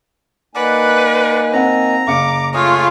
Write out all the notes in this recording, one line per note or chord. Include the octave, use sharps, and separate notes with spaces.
A#3 D#4 B4 D5 F#5 G#5
C4 F#5 A#5
F#1 F5 D6 C#7
A3 F4 G#4 C#5